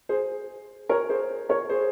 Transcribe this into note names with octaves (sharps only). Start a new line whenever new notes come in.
G#4 C5
A#4 C#5
G#4 C5
A#4 C#5
G#4 C5